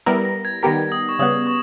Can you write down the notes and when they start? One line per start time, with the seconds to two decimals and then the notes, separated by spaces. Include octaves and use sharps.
0.06 G3 B3 E4 A#4 A#6
0.25 A#6
0.45 G#6
0.63 D#3 G3 B3 G4 A#4 A#6
0.92 D#6
1.09 C#6
1.19 C#3 G3 B3 D#6
1.47 C#6